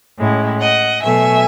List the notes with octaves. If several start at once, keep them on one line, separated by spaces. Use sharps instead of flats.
A2 G#3 C#4 E4
D#5 F#5
B2 F#3 A3 E5 G#5